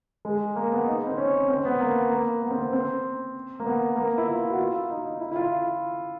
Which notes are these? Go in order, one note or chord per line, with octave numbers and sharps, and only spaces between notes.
G#3
A#3
B3
D#4
C4
C#4
C4
B3
A#3
A#3
B3
C4
B3
C4
A#3
B3
A#3
B3
E4
F4
F#4
F4
D#4
D#4
E4
E4
F4